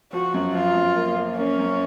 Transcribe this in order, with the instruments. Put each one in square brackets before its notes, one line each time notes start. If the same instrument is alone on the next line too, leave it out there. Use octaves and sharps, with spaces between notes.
[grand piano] F3 [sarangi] F#4
[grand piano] F#2
[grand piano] F3 [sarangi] F4
[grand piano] F#2
A#3
A#3
[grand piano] A#3 [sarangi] C#4
[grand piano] F#2